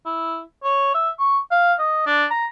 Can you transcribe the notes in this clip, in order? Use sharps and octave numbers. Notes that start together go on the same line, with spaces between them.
E4
C#5
E5
C#6
F5
D#5
D4
A#5